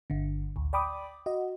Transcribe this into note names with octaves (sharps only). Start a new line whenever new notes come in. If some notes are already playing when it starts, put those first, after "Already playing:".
G1 D3
A1 D2
D5 G5 B5 D6 D#6
F#4 D#5